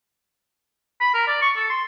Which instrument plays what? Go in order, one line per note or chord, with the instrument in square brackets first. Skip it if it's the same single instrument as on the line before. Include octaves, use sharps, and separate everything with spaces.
[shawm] B5
A#4
D5
C#6
A4
C6